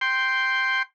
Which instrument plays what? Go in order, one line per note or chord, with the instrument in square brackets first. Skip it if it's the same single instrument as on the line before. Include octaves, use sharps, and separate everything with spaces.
[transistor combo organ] G5 C6